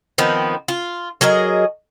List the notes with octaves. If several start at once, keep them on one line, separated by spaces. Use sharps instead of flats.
D#3 F3 B3 C4
F4
F#3 G#4 A#4 D#5